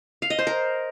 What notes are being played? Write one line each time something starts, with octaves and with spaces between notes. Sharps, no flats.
F5
D#5
C5
A#4